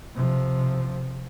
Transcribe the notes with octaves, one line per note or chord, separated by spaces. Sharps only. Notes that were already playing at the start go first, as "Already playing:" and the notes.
C3 F3